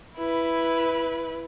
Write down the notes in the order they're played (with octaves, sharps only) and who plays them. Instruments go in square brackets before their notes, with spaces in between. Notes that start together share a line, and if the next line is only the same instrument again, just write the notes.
[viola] E4 B4